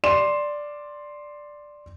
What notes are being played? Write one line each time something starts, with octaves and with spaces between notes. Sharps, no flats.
D5 C6 E7